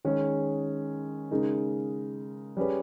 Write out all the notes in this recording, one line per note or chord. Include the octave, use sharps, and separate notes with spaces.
D#3 G#3 C#4 G#4
C#3 G#3 D#4 A#4
G3 C#4 G#4 B4